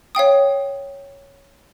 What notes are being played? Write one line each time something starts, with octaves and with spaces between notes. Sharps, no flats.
C#5 F5 G5 D#6